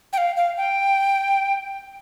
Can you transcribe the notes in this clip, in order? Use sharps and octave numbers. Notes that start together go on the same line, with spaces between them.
G5
F5
F5
G5